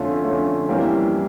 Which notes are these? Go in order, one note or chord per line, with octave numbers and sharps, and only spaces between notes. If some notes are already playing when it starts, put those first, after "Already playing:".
Already playing: F2 D3 A3 C#4 F4
F2 D3 A3 C#4 F4
F2 E3 G3 A#3 C#4
E3